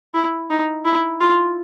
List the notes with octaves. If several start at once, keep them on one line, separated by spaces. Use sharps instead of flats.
E4
D#4
E4
F4